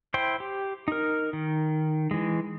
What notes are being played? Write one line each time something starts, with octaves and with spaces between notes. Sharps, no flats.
E4 C5 G5 C6
G4
D#4 A#4
D#3
E3 G#3